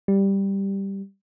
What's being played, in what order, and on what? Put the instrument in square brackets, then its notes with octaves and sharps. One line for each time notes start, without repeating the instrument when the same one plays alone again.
[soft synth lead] G3